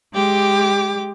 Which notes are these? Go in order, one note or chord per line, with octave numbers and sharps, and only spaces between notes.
G#3 G4 D6